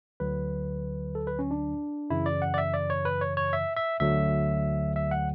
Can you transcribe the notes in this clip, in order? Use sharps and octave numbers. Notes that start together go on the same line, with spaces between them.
D2 D3 F#3 B4
A4
B4
C#4
D4
F#2 C#3 E3 E4
D5
F#5
D5
E5
D5
C#5
B4
C#5
C#5
E5
E5
D2 D3 F#3 E5
E5
F#5